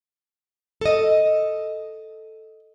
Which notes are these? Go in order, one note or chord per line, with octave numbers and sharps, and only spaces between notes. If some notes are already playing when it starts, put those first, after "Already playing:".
A4 D#5